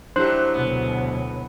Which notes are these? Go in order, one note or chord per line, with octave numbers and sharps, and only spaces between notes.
F#3 A3 D4 E4 G4 C5 F#6
D2 B2 F#3 B3